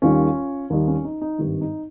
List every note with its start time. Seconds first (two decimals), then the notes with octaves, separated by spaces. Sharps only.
0.02 D#2 D#3 G3 C#4 F4
0.70 D#2 D#3 G3 D#4
0.87 C#4
1.05 D#4
1.21 D#4
1.38 G#1 G2 D#3 G3
1.61 D#4